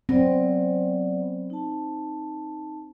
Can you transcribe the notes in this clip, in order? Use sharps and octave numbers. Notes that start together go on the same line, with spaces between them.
F#3 B3 C4 D5
D#4 A5